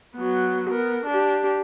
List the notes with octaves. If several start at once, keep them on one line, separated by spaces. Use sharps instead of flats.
F#3 B3
B3 A#4
D4 G4